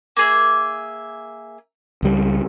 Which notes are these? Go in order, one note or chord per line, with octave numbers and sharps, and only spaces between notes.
A#3 G#4 E5
C#2 G3